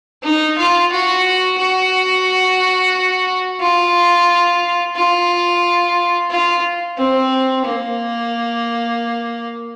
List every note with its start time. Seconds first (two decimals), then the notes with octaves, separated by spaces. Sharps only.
0.23 D#4
0.58 F4
0.92 F#4
1.58 F#4
3.60 F4
4.95 F4
6.30 F4
6.98 C4
7.65 A#3